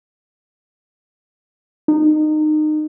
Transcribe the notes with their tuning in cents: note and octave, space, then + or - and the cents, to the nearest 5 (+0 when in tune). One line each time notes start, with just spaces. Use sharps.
D#4 -25